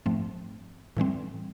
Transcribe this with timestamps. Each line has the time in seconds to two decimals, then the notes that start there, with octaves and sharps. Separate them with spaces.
0.06 G#2 F3 A3 C4
0.97 A2 E3 G3 C4